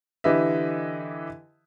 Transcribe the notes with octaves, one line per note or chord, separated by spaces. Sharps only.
D3 E3 G4 B4 D#5 E5